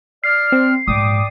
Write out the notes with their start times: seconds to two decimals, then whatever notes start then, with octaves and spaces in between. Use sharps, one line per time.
0.24 D5 F6 C7
0.52 C4
0.88 A#1 G#2 D5 G5 D6 D#6